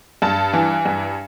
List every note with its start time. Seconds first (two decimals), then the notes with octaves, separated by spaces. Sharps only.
0.22 G2 A5
0.53 E3
0.85 G2